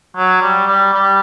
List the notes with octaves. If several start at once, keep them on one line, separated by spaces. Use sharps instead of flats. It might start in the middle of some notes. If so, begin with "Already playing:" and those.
F#3
G3
G3
G3